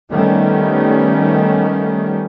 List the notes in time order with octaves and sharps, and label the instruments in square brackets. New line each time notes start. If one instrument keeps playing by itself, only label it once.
[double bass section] D#3 G3 A3 B3 C#4